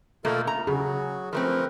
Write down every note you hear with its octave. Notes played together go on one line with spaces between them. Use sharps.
B2 A3 A#3 F4 A4 A#4
F4 A#5
C#3 F#3 F#4 G#4
F3 A3 C4 A#4 B4